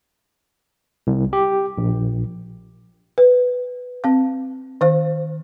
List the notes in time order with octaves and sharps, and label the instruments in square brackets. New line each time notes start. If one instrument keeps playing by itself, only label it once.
[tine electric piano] C2
G4
A#1
[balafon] B4
C4 F5
D#3 C5 F5